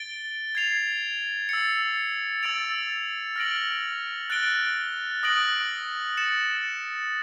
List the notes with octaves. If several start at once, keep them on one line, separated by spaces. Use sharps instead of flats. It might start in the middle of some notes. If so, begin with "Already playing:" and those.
Already playing: A6 D7 G7
G#6 C7 F7
E6 A6 C#7
E6 A6 D7 F7
F6 A#6 D7 F#7
F#6 A6 D7 G7
D#6 F#6 A#6 D7 F#7
A6 C#7 E7